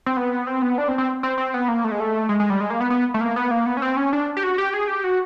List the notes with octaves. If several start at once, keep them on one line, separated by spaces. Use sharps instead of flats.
C4
B3
C4
B3
D4
C4
C4
C4
C4
B3
A#3
A3
G#3
A3
G#3
G#3
G3
G#3
A#3
B3
B3
A3
A#3
B3
A#3
B3
C#4
C4
C#4
D4
G4
F#4
G4
G#4
G4
F#4